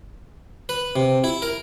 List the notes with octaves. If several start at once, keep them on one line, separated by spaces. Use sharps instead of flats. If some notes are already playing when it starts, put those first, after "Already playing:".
B4
C3
E4
A#4